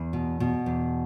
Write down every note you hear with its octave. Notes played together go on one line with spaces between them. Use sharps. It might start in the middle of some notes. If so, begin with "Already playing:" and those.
Already playing: E2
B2
B2
E2